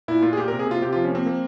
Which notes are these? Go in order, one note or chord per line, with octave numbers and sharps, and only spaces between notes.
A#2 E4
A#2 F4
G#4
A#3 G4
C3 A#4
G#4
C3 F4
C3 G4
F3 F4
C#4
A#3 C4
A#3